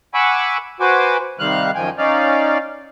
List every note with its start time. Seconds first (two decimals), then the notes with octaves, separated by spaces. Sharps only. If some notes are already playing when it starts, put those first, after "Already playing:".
0.14 F#5 G#5 B5 C#6 D6 E6
0.80 F#4 B4 C5 G#5 D6
1.39 C3 D#3 G3 F5 F#6
1.75 F#2 D#3 F3 G5 G#5
1.98 C#4 D#4 D5 F5